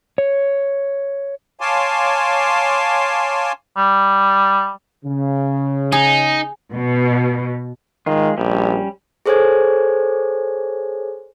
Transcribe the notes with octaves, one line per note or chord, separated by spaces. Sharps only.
C#5
C#5 F5 G#5 A5 C6 D6
G3
C#3
D#4 G#4
B2
D#3 G#3 F4
A#1 G3 C#4
G#4 A4 C5 C#5 G#5 G#6